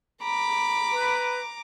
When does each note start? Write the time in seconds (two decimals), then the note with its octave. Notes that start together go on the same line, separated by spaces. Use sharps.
0.22 A#5 B5 D6
0.94 B4